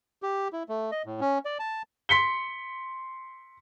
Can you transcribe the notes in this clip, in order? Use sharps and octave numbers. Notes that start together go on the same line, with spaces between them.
G4
E4
A3
D#5
A2
C#4
D5
A5
C6 B6 C#7 G7